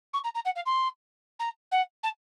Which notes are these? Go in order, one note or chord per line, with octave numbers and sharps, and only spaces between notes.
C#6
A#5
A#5
F#5
F5
C6
A#5
F#5
A5